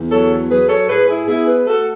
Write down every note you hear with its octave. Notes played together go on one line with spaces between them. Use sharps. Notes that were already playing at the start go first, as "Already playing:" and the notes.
Already playing: E2
F#3 A4 C#5
F#3 G#4 B4
A4 C#5
A2 G#4 B4
E4 G#4
B3 E4 G#4
G#4 B4
A3 F#4 A4